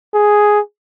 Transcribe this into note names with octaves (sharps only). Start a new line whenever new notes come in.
G#4